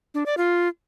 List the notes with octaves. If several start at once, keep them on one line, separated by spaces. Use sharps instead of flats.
D4
D5
F4